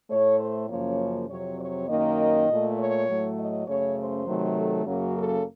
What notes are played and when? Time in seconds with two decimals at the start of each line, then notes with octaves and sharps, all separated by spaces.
0.09 A2 A3 C#5
0.39 C5
0.68 F#2 C#3 F3 A#3 C#5
1.28 F2 C3 F#3 C#5
1.59 C#5
1.87 F#2 D#3 A#3 D#5
2.48 A#2 A3
2.77 C#5
3.07 A2 F#3 A3
3.36 D#5
3.66 F#2 C#3 A3 C#5
3.96 C5
4.26 C3 D#3 F#3 A3
4.56 A4
4.85 F#2 C#3 F#3 A#3 F#4
5.14 A4